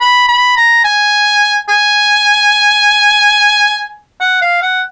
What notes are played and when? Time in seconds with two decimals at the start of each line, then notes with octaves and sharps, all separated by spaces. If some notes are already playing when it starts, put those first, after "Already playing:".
0.01 B5
0.28 B5
0.57 A#5
0.84 G#5
1.69 G#5
4.20 F#5
4.42 F5
4.63 F#5